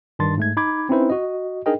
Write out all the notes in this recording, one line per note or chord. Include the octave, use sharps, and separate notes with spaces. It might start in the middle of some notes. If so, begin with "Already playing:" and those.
G2 D#3 D4 C6 A6
G#2 A3 G#6
D#4 B5 D6 G#6
C4 C#4 D#4 E4 B4 C5
F#4 D#5
D4 D#4 G#4 A#4 D#5 G5